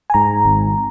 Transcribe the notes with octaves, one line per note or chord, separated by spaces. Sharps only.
G#5
G#2 A#5
G#1